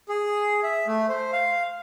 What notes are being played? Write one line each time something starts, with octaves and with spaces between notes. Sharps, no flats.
G#4
E5
A3
C5
F5